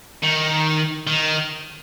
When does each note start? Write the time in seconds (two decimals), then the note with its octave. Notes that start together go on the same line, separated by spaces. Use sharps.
0.23 D#3
1.07 D#3